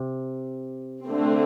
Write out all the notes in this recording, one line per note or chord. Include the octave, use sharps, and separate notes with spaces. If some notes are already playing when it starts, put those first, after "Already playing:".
Already playing: C3
D3 A3 C4